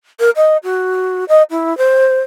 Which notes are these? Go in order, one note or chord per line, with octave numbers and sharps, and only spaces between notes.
A#4
D#5
F#4
D#5
E4
C5